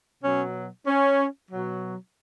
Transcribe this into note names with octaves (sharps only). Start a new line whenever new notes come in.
B2 F#3 C#4
C#4
B2 F#3